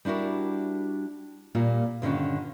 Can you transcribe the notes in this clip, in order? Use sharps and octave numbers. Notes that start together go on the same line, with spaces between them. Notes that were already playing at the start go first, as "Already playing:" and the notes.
G3 D4 E4 F#4 A#4
A#2 G3 A#3 F4
G2 D3 D#3 C#4 F4